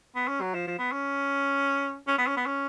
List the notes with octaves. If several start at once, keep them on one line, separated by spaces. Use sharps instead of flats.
B3
C#4
F#3
F3
F3
B3
C#4
C#4
B3
C#4
B3
C#4